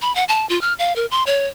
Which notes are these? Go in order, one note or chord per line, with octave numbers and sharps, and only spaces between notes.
B5
F#5
A5
F4
F6
F5
A#4
C6
C#5